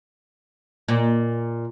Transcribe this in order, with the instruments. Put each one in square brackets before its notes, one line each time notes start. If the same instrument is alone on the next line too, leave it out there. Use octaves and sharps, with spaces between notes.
[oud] A#2